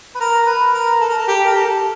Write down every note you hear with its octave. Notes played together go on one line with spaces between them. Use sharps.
B4
A#4
B4
A#4
A4
A#4
A4
G4
A#4
A4